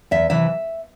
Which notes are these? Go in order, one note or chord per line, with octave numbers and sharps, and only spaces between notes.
E2 E5
C3 E3 E5